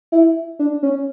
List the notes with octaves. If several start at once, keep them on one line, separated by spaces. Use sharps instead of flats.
E4
D4
C#4